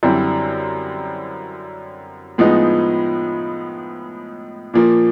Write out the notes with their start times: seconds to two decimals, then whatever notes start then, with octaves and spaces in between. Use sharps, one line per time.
0.03 F#2 D3 G3 C4 E4
2.38 A2 F3 G#3 B3 D#4
4.74 A#2 F3 A#3